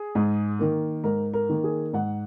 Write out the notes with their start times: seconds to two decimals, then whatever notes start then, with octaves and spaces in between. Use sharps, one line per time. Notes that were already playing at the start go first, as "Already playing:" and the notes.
Already playing: G#4
0.15 G#2
0.59 D#3 A#3
1.04 G#2 A#4
1.34 A#4
1.49 D#3 A#3
1.64 G#4
1.93 G#2 F#5